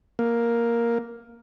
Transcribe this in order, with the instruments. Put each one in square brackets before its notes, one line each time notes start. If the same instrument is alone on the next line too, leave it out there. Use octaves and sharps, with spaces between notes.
[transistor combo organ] A#3